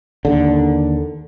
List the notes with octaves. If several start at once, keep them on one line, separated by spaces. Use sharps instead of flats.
D#2 D3